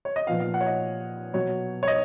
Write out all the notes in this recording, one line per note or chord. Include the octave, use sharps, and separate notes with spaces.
C#5
D#5
A#2 F3 B3 F5
F5
F#5
C#5
D#5
B2 F#3 B3 C#5
C#5
D#5